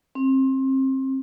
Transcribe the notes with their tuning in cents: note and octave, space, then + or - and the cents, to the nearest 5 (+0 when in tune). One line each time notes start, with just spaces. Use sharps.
C4 +30